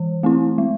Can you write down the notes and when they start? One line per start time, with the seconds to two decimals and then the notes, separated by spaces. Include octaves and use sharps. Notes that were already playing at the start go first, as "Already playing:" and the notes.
Already playing: E3
0.23 A3 C4 E4
0.58 G#3